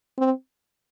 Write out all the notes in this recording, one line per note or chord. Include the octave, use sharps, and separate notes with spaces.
C4